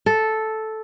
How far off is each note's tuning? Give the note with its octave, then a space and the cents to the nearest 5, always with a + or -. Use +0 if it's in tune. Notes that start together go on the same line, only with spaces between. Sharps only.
A4 -5